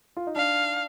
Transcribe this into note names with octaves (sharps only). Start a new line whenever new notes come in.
F4
D#4
D4 F5